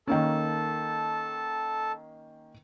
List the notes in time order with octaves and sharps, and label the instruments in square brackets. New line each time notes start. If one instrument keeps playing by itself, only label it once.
[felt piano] D#3 A#3 C#4 [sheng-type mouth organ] A4 A5